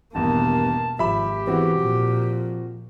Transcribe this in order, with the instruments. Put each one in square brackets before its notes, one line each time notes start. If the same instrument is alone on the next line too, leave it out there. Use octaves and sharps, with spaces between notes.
[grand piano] G#1 E2 [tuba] G2 [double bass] B2 A#3 [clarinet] A5
[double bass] G#1 [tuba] F3 [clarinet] G4 [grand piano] E5 B5
[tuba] E2 [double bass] E3 [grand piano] C4 F#4
[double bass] A#2 [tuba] F3